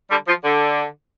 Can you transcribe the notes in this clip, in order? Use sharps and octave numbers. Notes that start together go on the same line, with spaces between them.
D3 G3
F3
D3